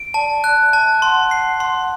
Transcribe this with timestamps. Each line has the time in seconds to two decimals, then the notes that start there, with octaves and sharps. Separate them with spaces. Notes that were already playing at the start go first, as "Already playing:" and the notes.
Already playing: D7
0.14 D5 A5
0.44 F#6
0.59 E5
0.73 A5
1.02 F#5 C6
1.31 C7
1.60 C6